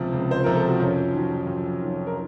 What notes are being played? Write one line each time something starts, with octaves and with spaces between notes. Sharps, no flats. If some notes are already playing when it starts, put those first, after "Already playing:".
Already playing: C#2 C3 F3
C#2
C5
C3 F3 A#4
A4
F#4
F2 C#4 F4
D#3 F#3
F2
D#3 F#3
A#4